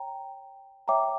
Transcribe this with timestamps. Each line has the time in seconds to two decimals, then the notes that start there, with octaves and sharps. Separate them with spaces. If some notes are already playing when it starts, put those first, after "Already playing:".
Already playing: C#5 G5 A#5
0.88 C#5 E5 G5 A#5 D6